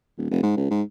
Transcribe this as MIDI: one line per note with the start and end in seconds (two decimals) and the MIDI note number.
0.17 0.30 27
0.30 0.42 29
0.43 0.52 44
0.57 0.69 37
0.70 0.82 44